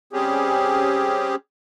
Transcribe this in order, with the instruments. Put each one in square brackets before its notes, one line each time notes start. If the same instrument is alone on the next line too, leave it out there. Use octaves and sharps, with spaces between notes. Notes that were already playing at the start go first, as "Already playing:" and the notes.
[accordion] G3 C4 C#4 G4 G#4